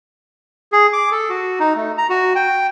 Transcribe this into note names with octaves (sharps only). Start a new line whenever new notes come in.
G#4
D6
A4
F#4
D#4
A3
A#5
F#4
G5